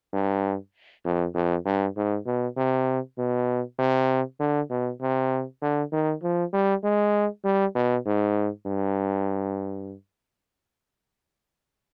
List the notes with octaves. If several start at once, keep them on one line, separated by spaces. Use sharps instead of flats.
G2
F2
F2
G2
G#2
B2
C3
B2
C3
D3
B2
C3
D3
D#3
F3
G3
G#3
G3
B2
G#2
G2